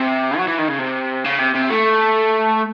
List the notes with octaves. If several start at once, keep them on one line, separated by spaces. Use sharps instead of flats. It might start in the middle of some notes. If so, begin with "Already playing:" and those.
Already playing: C3
F#3
E3
D#3
C#3
C3
C#3
C3
C3
A3